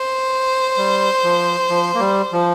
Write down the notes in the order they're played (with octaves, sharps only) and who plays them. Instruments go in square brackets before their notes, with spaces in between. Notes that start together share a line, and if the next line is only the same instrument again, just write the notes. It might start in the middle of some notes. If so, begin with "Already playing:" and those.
Already playing: [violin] C5
[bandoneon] G3
F3
F3
A#3
G3
F3